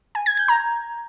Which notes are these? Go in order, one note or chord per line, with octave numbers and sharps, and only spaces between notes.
G#5
G#6
G6
A#5